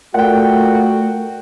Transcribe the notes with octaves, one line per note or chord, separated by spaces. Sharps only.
A#2 A3 F#4 F#5 G5